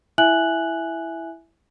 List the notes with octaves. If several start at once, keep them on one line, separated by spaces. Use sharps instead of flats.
E4 E5 G#5 F#6 F#7